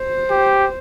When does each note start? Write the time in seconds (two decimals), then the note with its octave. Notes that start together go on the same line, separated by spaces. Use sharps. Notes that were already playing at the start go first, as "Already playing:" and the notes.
Already playing: C5
0.30 G4